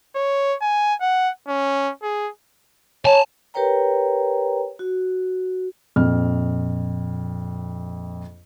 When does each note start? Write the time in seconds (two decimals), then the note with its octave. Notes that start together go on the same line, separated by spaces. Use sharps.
0.15 C#5
0.62 G#5
1.01 F#5
1.48 C#4
2.03 G#4
3.05 C#5 G#5 A5
3.54 G4 A#4 B4 C#5 G5 A#5
4.79 F#4
5.96 A#1 F2 F6